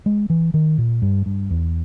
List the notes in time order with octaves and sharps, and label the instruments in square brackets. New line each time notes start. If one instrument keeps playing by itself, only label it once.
[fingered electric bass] G#3
E3
D#3
A#2
G2
G2
E2